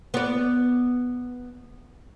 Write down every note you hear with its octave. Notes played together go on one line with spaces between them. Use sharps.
B3 D5